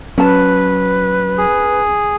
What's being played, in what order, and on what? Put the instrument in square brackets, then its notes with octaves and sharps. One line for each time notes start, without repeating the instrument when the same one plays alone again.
[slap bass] F#3 [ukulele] C#4 A5 [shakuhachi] B4
[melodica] G#4